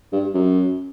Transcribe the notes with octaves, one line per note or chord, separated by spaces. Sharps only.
G2
F#2